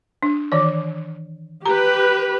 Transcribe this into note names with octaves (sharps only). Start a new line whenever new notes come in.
D4
D#3 E3 D5
G4 B4 A#5